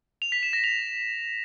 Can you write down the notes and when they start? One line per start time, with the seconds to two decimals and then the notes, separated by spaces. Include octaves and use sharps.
0.22 F7
0.32 B6
0.43 E7
0.53 A#6
0.64 F7